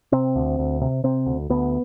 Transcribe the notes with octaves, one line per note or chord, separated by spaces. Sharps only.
C3 C4
D2
D2
C3
C3 C4
D2
D2 B3